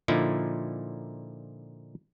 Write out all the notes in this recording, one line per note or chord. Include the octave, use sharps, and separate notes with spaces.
A#2 D3 F3 D#4 E4